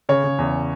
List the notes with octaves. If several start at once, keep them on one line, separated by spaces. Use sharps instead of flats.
C#3 C#5
C#3
E2